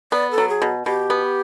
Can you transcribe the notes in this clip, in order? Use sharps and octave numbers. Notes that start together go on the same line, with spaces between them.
B3 D5
A4
F#3
G#4
B2
B2 G4
B3